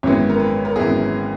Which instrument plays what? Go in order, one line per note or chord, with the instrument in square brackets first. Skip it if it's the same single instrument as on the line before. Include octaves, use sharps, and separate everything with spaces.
[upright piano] G#1 F#2 E3 G#3 B3 C#5
A#4
B4
A#4
G#1 F#2 E3 G#3 B3 G#4